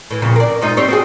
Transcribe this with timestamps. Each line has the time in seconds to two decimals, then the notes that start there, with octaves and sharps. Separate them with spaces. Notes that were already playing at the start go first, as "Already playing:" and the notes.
0.11 A2 E3
0.22 F2 A#2 C#3
0.36 A#4 D5
0.62 G#2 D#4 F4
0.77 G3 C4 C#5
0.88 C4 F#4 G#4